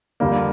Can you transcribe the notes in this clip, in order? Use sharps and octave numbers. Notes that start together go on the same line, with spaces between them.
F2 D3 G3 A#3